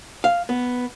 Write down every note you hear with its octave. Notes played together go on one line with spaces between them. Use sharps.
F5
B3